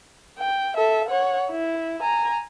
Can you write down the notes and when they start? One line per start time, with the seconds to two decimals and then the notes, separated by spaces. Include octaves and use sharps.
0.39 G5
0.77 A4 E5
1.09 C#5 F#5
1.51 E4
2.01 G#5 A#5